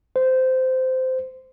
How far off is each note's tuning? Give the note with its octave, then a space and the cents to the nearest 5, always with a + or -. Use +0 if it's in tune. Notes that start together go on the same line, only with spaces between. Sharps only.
C5 -15